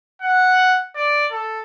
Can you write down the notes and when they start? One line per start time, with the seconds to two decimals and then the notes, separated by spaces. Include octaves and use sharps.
0.22 F#5
0.96 D5
1.32 A4